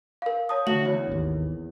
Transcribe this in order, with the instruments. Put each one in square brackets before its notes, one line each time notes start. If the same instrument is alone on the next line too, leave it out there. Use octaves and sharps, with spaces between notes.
[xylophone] A#4 F5
C#5 A5 D#6
[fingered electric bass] D3 A3 [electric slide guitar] F#4 [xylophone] F#7
[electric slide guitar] E2 [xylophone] C#5
[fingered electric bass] G#1 D#2